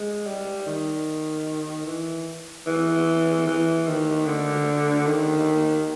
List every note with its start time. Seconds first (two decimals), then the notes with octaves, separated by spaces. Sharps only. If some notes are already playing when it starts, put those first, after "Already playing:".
Already playing: G#3
0.26 G3
0.66 D#3
1.86 E3
2.66 E3
3.46 E3
3.87 D#3
4.26 D3
5.06 D#3